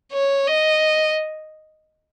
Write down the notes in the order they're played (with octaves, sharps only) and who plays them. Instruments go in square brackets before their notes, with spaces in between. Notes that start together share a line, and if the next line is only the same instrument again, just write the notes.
[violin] C#5
D#5